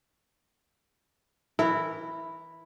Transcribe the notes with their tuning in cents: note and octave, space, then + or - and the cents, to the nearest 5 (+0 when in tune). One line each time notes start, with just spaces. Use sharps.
E3 -10 E4 +0 A#4 -25